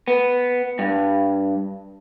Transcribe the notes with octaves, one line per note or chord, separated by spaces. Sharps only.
B3
G2